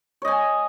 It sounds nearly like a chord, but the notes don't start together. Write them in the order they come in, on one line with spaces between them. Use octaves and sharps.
C#5 D#5 G#5